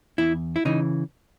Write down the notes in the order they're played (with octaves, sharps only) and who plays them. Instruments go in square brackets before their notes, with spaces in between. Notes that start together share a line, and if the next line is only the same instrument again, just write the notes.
[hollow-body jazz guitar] E2 E4
E4
C#3 E3 D#4